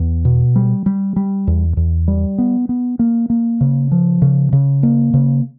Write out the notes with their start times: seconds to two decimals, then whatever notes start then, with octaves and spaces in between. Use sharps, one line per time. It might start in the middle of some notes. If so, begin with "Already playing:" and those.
Already playing: E2
0.25 B2
0.56 G3
0.86 G3
1.16 G3
1.47 E2
1.77 E2
2.08 G3
2.38 B3
2.69 B3
2.99 A#3
3.30 A#3
3.61 C#3
3.91 F3
4.22 C#3
4.53 C#3
4.83 A#3
5.14 C#3